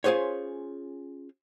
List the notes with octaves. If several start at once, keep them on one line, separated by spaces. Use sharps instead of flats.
C#4 F4 G#4 C5 C#5